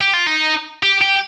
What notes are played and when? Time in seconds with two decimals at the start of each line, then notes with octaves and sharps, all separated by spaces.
0.01 G4
0.13 F4
0.26 D#4
0.83 G4
1.01 G4